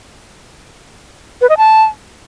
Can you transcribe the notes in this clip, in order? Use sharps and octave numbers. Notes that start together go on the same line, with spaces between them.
B4
D#5
A5